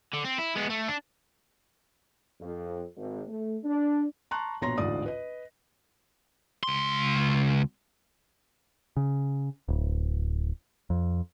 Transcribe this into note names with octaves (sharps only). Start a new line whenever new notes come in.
D3
C4
E4
G#3 B3
A3
D4
F2
G#1
A3
D4
A5 A#5 C6 C#6 F#6
A#1 B2 C#5 A#5 C6 A#6
A1 D2 G#2 F4 D5 D#6
B4 D#5
C#2 C6
C#3
D1
F2